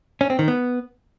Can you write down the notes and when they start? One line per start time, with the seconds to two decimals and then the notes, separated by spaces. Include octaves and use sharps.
0.21 C#4
0.30 C4
0.39 D#3
0.48 B3